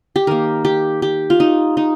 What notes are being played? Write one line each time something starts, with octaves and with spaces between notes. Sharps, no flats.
G4
D#3 A#3 A#4
G4
G4
F4
D#4
D#4